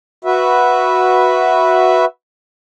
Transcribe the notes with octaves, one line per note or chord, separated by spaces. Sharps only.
F#4 B4 E5